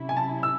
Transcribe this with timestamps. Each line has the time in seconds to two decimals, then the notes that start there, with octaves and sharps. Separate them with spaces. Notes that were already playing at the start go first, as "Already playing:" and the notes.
Already playing: C3 F#3 C#4 E4
0.09 G#5
0.17 A5
0.43 E6